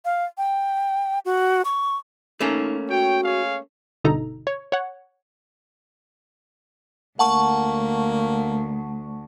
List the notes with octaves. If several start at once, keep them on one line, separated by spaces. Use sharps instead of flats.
F5
G5
F#4
C#6
A3 A#3 C#4 D#4
F#4 C#5 G5
G#4 C#5 F5
G1 B2 D3 D#4 A4 A#5
C#5
C#5 F#5
D2 A#3 F#5 A5 C#6